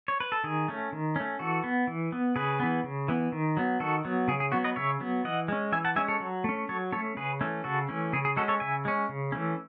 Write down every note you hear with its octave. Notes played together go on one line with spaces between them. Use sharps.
C#5
B4
A4
D#3 G#4
A3 C#4
D#3
A3 C#4
E3 F#4 A4
B3
E3
B3
C#3 G#4 B4
E3 B3
C#3
E3 B3
D#3
F#3 B3
D#3 F#4 A4
F#3 B3
C#3 G#4
G#4
F#3 B3 F#4
B4 D#5
C#3 C#5 E5
F#3 B3
E3 D#5 F#5
G#3 C#4
E3 E5 G#5
F#5 A5
G#3 C#4 E5 G#5
A4 C#5
F#3
A3 C#4
F#3 A4 C#5
A3 C#4 A4 C#5
C#3 G#4 B4
E3 A3 C#4
C#3 F#4 A4
E3 A3 C#4
C#3 G#4
G#4
G#3 C#4 F#4 A4
A4 C#5
C#3 E5 G#5
G#3 C#4
C#3
E3 A3 C#4